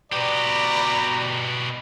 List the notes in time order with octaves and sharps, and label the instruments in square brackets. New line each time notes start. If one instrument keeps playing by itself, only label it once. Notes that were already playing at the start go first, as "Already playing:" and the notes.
[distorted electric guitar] B2 G4 [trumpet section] B4 D5 A#5